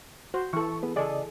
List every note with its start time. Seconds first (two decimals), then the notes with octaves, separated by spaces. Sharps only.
0.34 F#4 C5
0.53 E3 A4 C#6
0.83 B3 G#4 B4
0.96 C#3 G#4 A4 D5 D#5